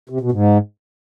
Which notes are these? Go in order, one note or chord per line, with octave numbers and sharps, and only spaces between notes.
C3
B2
G#2